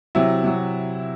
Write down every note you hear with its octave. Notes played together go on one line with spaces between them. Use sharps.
C3 F#3 E4
C3 F#3